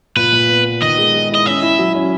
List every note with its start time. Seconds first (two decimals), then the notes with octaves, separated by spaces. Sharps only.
0.16 A#2 B4
0.33 A#2
0.49 B3
0.65 B3
0.81 D#3 D#5
0.98 G#3
1.14 G#3
1.30 E4 D#5
1.46 C#4 E5
1.62 E4
1.79 F#3
1.95 C#4